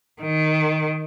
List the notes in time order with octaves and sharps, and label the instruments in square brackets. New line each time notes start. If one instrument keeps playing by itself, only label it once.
[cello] D#3